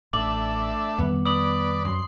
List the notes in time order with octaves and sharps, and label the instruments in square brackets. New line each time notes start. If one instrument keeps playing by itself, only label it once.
[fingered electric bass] A1 [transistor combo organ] A3 D4 E5 [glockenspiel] D6 F#7
[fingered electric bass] F2 D#3 G3 [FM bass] B3
[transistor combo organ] B4 D5 [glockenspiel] D#6 F#7
[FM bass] F#2 [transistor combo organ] C6